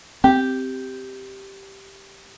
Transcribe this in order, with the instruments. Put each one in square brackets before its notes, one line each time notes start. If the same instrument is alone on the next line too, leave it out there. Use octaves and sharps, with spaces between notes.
[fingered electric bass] C4 [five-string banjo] G4